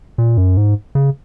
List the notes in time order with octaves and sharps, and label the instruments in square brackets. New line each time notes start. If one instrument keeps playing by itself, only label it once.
[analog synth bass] A#2
F#2
G#2
C#3